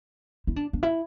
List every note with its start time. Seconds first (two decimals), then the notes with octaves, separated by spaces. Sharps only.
0.47 E4
0.56 D4
0.73 D4
0.83 E4